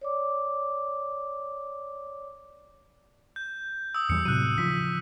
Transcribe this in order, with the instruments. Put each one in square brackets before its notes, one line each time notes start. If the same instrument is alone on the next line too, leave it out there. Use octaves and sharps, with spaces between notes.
[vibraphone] C#5 D5 D6
[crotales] G6
D#6 E6
[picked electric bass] E2 E3 G3 [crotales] C#7
[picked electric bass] A2 C3 F#3 [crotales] F#6 C#7 D#7
[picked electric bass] C#3 F3 [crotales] B6